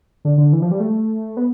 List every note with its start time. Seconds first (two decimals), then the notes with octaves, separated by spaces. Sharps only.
0.25 D3
0.38 D3
0.53 E3
0.62 F3
0.71 G3
0.80 A3
1.37 B3